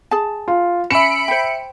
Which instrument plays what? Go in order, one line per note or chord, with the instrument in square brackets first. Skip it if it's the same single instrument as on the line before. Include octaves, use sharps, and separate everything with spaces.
[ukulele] G#4 A5
[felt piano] F4
[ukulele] C#4 B4 [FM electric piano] E5 C#7 [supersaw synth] B5 D7 [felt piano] E7
[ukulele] C5 G5